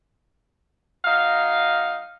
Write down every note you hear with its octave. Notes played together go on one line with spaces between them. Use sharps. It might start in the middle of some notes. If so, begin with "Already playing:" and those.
F#3 D#4 F5